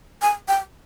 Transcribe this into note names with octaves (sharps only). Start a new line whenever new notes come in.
G#5
G5